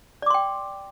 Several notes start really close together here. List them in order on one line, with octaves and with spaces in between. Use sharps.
D5 D6 C6 G5